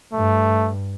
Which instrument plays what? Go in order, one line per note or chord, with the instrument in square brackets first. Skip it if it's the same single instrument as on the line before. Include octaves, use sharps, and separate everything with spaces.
[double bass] G2 [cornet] A3